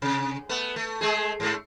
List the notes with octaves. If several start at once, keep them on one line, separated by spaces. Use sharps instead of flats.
C3
A3 B3
A3
G#3 A3 G#4
G#2 A3